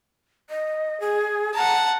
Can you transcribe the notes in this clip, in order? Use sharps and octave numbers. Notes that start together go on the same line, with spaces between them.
D#5
G#4
F#5 A5 A#5